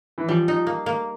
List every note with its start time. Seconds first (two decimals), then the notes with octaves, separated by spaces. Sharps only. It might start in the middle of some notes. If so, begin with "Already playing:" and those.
0.18 E3
0.28 F3 G3
0.48 D#4
0.67 A#3
0.86 A#3